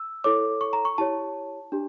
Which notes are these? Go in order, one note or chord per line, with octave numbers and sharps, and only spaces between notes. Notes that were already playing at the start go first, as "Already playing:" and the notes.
Already playing: E6
E4 A4 C#5 D6
C#6
A#5
C#6
E4 G4 C#5 A5
D4 G4